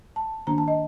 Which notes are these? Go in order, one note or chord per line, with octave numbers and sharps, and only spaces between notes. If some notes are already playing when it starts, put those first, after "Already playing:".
A5
D#3 A#3 D4 A#5
A5
D#5